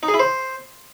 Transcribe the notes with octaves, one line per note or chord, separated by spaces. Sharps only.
D#4
G#4
E4
C5